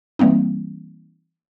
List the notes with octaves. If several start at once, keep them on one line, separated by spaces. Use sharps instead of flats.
E3 G3 A#3 C4 D#4